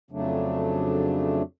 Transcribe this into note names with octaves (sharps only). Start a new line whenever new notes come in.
F2 C#3 F#3 A3 D4